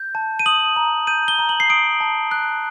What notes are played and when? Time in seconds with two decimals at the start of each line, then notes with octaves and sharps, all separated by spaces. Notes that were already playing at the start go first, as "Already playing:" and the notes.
Already playing: G6
0.15 A5
0.39 D#7
0.46 D#6 F#7
0.76 A#5
1.07 G6 D#7
1.28 G7
1.39 A#5
1.49 F#7
1.60 C7
1.70 D#6 D7
2.01 A5
2.31 F#6